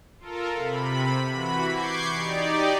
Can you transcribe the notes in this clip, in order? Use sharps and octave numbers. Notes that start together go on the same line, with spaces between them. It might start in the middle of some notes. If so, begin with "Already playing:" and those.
F4 A4 A#4
C3 B5
E3 F#4 B5
C#6 D6 G6 G#6 C7
D#4 G4 D5